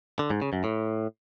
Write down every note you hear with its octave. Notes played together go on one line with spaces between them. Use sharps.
D3
G#2
C#3
F#2
A2